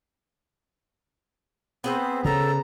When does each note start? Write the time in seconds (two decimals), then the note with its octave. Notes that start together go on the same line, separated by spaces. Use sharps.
1.84 B3 C4 G#4 C5
2.25 C#3 A4 A#5